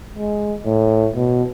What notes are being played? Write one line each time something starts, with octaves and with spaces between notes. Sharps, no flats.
G#3
A2
B2